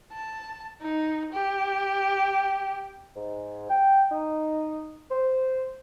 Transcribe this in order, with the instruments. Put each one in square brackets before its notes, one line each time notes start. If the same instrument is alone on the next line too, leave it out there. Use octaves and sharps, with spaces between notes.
[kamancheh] A5
D#4
G4
[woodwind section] G#2
G5
D#4
C5